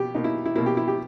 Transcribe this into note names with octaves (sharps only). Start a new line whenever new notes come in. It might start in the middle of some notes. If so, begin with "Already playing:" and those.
Already playing: B2 A#3 G4
B2 A#3 D#4
E4
E4
B2 A#3 E4
G4
E4
G4